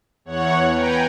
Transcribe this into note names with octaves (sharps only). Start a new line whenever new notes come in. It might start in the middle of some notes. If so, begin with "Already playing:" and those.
E2 C#5 F#5
B4 G5 G#5 A#5